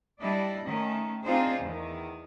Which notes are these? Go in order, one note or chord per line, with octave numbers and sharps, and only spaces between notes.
G3 D4 E4 D5 D#5
D#3 A3 C#4
C4 D4 D#4 F4 G#4 C5
E2 D#3